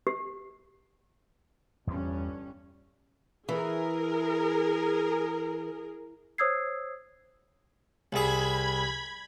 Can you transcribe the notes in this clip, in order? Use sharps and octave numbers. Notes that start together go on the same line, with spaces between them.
G4
G1 E2 G2 G3 C#4
E3 G#4 A#4
C5 C#5 D#6 E6 G#6 C7
C2 G#4 B5 G#6